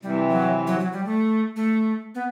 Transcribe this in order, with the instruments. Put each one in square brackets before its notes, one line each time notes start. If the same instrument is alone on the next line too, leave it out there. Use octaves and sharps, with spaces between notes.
[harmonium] C3 E3 [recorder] G3
[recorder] F#3
F#3
F#3
G3
A3
A3
B3